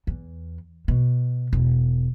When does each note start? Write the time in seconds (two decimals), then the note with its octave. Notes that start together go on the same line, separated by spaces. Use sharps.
0.07 E2
0.88 B2
1.53 E1